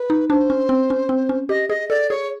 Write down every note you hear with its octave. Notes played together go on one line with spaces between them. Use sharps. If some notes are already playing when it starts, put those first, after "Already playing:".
Already playing: B4
D#4
D4 C5
C#4
C4
C#4
C4
C#4
G4 D#5
G#4 D#5
A4 D5
G#4 C#5